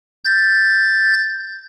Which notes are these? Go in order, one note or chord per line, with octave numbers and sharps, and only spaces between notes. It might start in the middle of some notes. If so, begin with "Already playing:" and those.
G6 A6